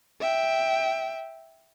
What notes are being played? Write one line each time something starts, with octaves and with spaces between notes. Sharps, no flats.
E5 G5